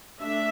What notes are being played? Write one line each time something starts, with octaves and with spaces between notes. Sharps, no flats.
A3 D4 E5